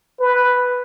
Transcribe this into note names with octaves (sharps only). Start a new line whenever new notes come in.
B4